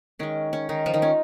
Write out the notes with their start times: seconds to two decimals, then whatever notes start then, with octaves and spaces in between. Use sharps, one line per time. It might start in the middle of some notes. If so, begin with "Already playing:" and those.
0.19 D#3 G#3 C#4
0.53 C#4
0.69 D#3 D#4
0.86 F3 F4
0.94 D#3 D#4
1.02 C#4